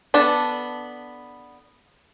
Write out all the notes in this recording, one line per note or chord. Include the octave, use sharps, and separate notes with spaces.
B3 D4 A4